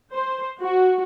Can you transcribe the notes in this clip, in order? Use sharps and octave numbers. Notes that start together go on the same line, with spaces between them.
C5
F#4